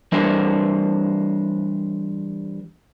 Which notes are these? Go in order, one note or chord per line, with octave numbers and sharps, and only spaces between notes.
E3 G3 D4 A#4 C5 E5